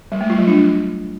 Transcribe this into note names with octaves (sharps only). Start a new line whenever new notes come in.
G3
A3
F4
F#3
D4